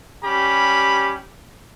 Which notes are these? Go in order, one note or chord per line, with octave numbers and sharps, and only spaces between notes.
G3 C#4 G4 B5